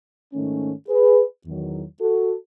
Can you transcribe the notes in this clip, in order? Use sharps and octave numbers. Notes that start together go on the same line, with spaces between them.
G#2 D#3 A3 C#4
G#4 B4
E2 D#3 F#3
F#4 A4